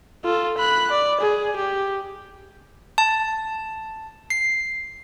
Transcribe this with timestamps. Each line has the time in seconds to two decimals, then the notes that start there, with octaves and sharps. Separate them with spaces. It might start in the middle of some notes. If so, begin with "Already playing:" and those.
0.24 F4 A4
0.58 B5 F#6
0.91 D5
1.20 G#4
1.56 G4
2.98 A5
4.30 C7